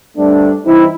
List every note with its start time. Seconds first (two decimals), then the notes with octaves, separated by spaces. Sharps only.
0.17 G2 G3 A3 C4 D4
0.66 G2 E3 C4 D#4 E4